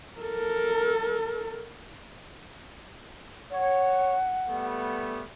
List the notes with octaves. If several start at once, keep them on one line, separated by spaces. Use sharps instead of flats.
A4 A#4
C#5 F#5
G3 A3 B3